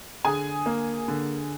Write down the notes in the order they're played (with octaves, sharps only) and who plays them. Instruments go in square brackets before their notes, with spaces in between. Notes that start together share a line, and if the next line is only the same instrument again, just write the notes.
[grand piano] D3 G#4 G#5
A#3
D3